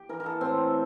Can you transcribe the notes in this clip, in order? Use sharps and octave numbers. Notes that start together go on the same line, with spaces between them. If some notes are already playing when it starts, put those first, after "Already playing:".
Already playing: G4
E3 A#4
A#4
A4
A2 C4